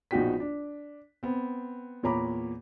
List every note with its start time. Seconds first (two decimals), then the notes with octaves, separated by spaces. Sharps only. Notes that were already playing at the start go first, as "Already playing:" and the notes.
0.11 A#1 B2 D#4 F#4 G5 B6
0.40 D4
1.23 B3 C4
2.03 E2 A#2 C#5 A#5 B5 D6